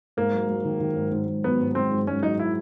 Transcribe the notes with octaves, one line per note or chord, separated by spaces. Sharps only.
G#2 A#3
F#3
F#3
D#3
D#3
G#2
G#2
G#2
F#3 B3
G#2
G#2 C4
G#2
G#2 C#4
F#3 D#4
E4